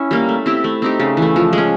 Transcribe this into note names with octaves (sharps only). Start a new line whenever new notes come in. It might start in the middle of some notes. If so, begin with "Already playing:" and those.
Already playing: C#4 E4
G3 A#3
A3
C4 E4 G4
A3
C4 D#4 G4
C#3
E3 A3
F3
G#3 C#4